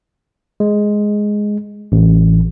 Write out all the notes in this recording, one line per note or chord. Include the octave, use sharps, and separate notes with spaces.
G#3
A1